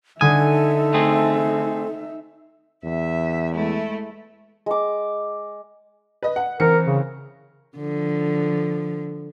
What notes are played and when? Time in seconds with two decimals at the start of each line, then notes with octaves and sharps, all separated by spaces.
0.21 D3 D#4 A4 E5 G#5 D#6
0.94 A3 C4 G#4
2.84 E2 E5
3.53 G#3 A3 E4
4.66 G#3 D6
6.23 B4 D#5
6.36 F#5
6.60 E3 C4 A#4 C#7
6.86 C#3
7.77 D3 F3